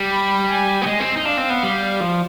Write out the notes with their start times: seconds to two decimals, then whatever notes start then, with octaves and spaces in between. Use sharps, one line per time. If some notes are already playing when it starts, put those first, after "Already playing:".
Already playing: G3
0.11 B5
0.49 G#5
0.82 B3
0.86 G#3
1.00 C4
1.16 D#4
1.24 D4 F5
1.37 C4
1.50 B3
1.63 G3
2.00 F3